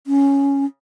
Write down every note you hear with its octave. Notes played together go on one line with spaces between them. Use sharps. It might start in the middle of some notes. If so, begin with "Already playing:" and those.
C#4